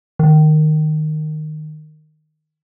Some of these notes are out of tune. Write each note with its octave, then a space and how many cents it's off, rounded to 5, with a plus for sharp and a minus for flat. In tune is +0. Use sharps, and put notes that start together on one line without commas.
D#3 -15